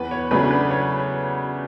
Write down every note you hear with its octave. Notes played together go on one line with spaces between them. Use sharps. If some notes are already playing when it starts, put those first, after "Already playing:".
Already playing: E2 B4
C#5
C#3 F#3 A3 D4 B4
B4
C#5